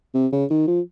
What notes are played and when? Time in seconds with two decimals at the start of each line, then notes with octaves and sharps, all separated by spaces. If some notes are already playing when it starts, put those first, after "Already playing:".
0.14 C3
0.32 C#3
0.50 D#3
0.67 F3